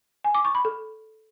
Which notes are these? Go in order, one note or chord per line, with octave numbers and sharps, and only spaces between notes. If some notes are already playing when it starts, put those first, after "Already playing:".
G#5
D6
C#6
B5
A4